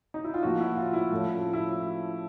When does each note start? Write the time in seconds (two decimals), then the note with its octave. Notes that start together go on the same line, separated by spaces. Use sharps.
0.14 D#4
0.24 E4
0.34 F4
0.43 A2 F3 A#3 F#4
0.60 E4
0.77 F4
0.93 E4
1.12 A2 F3 A3 C#4
1.53 E4